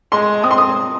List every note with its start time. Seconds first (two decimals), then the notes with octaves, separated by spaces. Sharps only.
0.12 G#3 C6
0.44 C4 D#6
0.51 C6
0.58 D#6